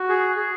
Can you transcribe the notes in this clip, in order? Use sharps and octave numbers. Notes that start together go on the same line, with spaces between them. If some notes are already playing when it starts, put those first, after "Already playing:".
Already playing: F#4
G#4
G#4